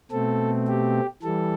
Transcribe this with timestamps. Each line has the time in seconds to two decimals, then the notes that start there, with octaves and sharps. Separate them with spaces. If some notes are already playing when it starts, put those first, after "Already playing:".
0.11 B2 A3 C4 A4
0.67 G4
1.23 E3 G3 A4